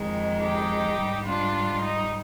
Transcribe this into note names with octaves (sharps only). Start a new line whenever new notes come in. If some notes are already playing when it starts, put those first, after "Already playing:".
Already playing: F2 D#3 G#3
D#4 G4
G#2 G3
D4 F4
D#4